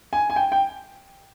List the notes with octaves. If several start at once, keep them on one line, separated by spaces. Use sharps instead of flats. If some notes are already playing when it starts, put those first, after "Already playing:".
G#5
G#5
G5
G5